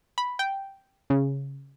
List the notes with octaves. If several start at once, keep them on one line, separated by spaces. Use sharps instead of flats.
B5
G5
C#3